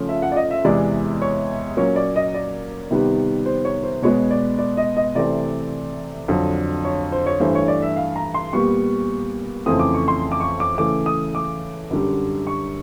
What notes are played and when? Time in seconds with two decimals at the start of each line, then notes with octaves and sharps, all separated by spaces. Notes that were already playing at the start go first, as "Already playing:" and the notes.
Already playing: C#3 F3 A3 C#4
0.09 E5
0.22 F#5
0.32 D5
0.36 D#5
0.51 E5
0.64 E2 C3 E3 G#3 B3 D5
1.22 C#5
1.77 A#2 F#3 A#3 C#4 C#5
1.96 D5
2.16 D#5
2.34 D5
2.91 C3 D#3 G3 B3
3.46 C5
3.65 C#5
3.83 C5
4.02 B2 G#3 B3 C#5
4.31 D5
4.59 D5
4.77 D#5
4.97 D#5
5.15 C3 E3 A3 C4 D5
6.28 F2 D3 F#3
6.85 C#5
7.12 C5
7.26 C#5
7.40 G2 E3 A3 C5
7.55 C#5
7.68 D5
7.82 E5
7.96 F5
8.16 A#5
8.34 C6
8.53 A#2 G3 B3 C#6
9.66 F2 C#3 E3 A3 C4 D#6
9.80 D6
9.94 C#6
10.08 C6
10.32 D6
10.40 C#6
10.60 D6
10.78 C#3 E3 A3 D6
11.06 D#6
11.35 D6
11.91 F#2 D3 G3
12.47 C#6